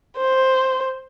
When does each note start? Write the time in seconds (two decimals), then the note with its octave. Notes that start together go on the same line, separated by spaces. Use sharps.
0.17 C5